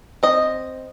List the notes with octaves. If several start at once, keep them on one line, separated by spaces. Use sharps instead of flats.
C4 D#5